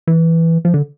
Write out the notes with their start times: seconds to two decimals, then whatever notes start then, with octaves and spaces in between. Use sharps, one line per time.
0.07 E3
0.65 F3
0.74 D3